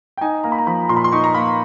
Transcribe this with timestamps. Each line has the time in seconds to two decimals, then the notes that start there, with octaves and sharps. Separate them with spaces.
0.17 G5
0.21 D#4 G#5
0.43 A#3 A#5
0.52 B5
0.58 A#5
0.66 F3 B5
0.89 A#2 C6
0.97 B5
1.04 C6
1.12 D#4 C#6
1.24 A#5
1.34 A#3 B5